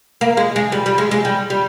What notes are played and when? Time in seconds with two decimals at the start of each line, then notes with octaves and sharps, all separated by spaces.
0.21 A#3
0.37 G#3
0.56 G#3
0.72 G3
0.86 G3
0.98 G#3
1.11 G#3
1.25 G3
1.50 G3